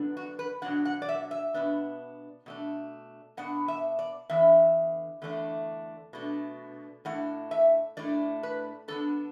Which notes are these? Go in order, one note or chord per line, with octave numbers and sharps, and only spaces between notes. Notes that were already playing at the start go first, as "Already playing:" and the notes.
Already playing: F#2 D3 B3 D4
F#4
B4
B2 F#3 D4 F#5
F#5
D5
E5
E5
B2 B3 D4
B2 A3 D4
B2 B3 D4 F#5
E5
D5
E2 D3 B3 E5
E2 D3 A3 D4
B2 A3 D4
A2 A3 D4 F#5
E5
A2 A3 D4 D5
B4
D3 B3 D4 A4